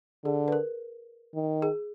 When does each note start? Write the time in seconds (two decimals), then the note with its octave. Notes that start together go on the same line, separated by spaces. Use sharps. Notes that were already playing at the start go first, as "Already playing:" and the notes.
0.24 D3 G#4
0.48 B4
0.52 A#4
1.35 D#3
1.62 G#4